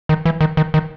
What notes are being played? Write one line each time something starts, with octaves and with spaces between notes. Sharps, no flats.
D#3
E3
D#3
D#3
D#3